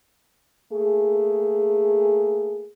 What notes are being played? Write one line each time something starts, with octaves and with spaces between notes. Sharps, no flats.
A3 A#3 G#4